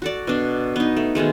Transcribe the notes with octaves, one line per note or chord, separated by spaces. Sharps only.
F#4 A4 D5
B2 D4
B3 D#4
A3
B2 D#3 G#3 A3